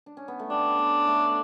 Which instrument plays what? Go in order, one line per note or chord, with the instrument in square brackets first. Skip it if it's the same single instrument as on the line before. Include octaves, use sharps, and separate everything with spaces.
[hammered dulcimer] D4
C#4
B3
A3
[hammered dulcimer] G3 [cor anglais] D4
[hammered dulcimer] B3
A3